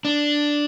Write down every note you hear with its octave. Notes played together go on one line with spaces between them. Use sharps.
D4